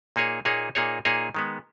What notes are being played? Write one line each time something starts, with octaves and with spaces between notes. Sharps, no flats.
A#2 A#3 D#4 G#4 C#5
A#2 A#3 D#4 G#4 C#5
A#2 A#3 D#4 G#4 C#5
A#2 A#3 D#4 G#4 C#5
D#3 G#3 B3